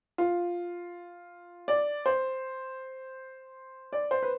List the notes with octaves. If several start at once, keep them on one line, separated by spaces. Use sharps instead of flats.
F4
D5
C5
D5
C5
B4